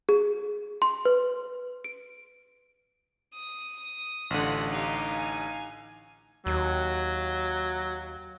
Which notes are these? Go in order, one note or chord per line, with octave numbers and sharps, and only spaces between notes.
G#4
C6
B4
D7
D#6
A1 D3 F4 F#5
D#4 G4 F5
G#5
D#2 F#3